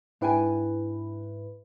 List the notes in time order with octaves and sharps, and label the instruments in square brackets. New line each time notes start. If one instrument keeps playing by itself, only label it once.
[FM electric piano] G#2 E4 B4 [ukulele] D4 G5 G#5